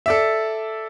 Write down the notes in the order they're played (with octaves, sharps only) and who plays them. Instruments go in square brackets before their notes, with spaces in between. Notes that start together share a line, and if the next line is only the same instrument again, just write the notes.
[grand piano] A4 D5 E5